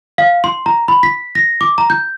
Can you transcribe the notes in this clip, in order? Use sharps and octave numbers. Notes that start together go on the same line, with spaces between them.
F5
C6
A#5
B5
B6
A#6
D6
A#5
G6